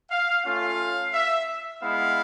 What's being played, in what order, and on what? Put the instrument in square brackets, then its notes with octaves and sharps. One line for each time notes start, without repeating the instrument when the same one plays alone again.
[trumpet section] F5
A3 C#4 F4 F5
E5
G#3 B3 E4 F5